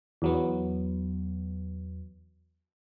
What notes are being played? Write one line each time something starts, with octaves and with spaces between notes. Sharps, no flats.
E2 F#3 B3